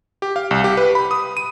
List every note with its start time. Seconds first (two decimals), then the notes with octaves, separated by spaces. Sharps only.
0.22 G4
0.36 F5
0.51 C2
0.64 G4
0.77 B4
0.95 B5
1.11 D#6
1.37 D#7